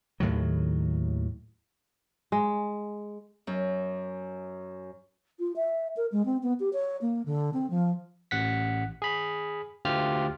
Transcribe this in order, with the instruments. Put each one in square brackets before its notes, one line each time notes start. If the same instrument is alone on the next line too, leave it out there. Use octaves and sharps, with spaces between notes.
[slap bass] D#2 A2 D#3 F#3
[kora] G#3
[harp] F#2
[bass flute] F4
E5
A#4
G#3
C4
B3
G4
C#5
A#3
D3
C4
F3
[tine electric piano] A1 F#5 B6
G#4 B5
D2 F4 G4 F6